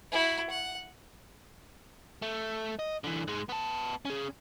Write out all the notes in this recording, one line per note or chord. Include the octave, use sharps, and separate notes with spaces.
E4 F#4
F#5
A3
D#5
D3 E3
G#2 G#3
B3 A5
C#4 G#4